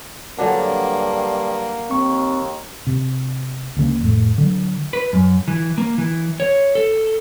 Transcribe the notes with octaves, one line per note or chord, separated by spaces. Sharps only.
G2 D3 F#3 A#3 D4 F#5
D#2 C4 C#6
C3
D2 C#3 A#3
F1 A2
D3 F#3
B4
F#2
E3
A#3
E3
C#5
A4